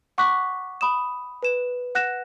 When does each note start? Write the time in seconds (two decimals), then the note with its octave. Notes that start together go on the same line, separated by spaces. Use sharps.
0.18 F#5 C#6 D6 F#6 B6
0.81 B5 D#6 E7
1.43 B4 E7
1.95 F#5 F#6 A#6 E7